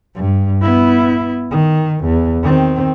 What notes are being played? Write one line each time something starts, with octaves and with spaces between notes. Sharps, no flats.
G2
B3 E4
D#3
E2
D#3 C4